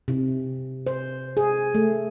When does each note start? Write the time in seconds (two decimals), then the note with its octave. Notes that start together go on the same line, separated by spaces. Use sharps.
0.08 C3
0.87 C5
1.37 G#4
1.75 A3